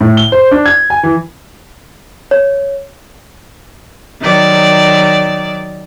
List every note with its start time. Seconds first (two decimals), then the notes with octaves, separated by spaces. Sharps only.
0.01 A2
0.17 G7
0.32 C5
0.51 D4
0.66 G#6
0.90 G#5
1.03 E3
2.31 C#5
4.21 D#3 F#3 D5